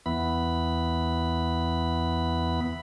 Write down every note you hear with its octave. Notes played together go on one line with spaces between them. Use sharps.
E2 E3 B3 B5